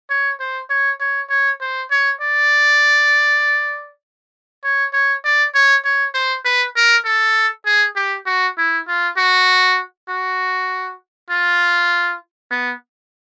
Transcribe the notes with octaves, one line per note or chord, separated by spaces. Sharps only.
C#5
C5
C#5
C#5
C#5
C5
C#5
D5
C#5
C#5
D5
C#5
C#5
C5
B4
A#4
A4
G#4
G4
F#4
E4
F4
F#4
F#4
F4
B3